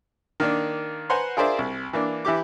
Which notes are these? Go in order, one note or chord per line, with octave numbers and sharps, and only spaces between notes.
D#3 A#3 D4
B4 C5 F#5 G#5 A#5 C6
F4 G#4 A#4 C5 D5 E5
C2
E3 A#3 D4
E3 E4 G4 D6